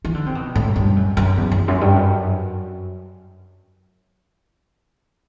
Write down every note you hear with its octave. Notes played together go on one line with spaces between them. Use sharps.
E3
D3
C3
B2
A2
F#2
G2
F#2
F#2
E2
E2
F#2
G2
F#2